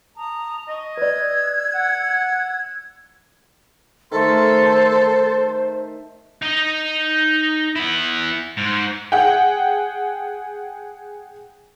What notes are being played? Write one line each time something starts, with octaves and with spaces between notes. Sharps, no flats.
A5 A#5 D#6
D#5 C#6
B4 D5 E6 F#6 G#6
F#5
D#3 A3 A4 C5 A5 C6
D#4 D#5
B3 E4
G#2
G#4 F#5 G5